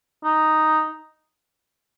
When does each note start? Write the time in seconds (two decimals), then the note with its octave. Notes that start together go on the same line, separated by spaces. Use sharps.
0.24 D#4